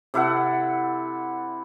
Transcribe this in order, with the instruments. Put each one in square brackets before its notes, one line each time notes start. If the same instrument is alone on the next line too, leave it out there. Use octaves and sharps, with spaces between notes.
[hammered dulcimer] C3 E4 A4 F#5